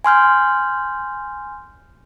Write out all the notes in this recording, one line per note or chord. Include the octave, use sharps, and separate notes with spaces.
G#5 C6 F6 G6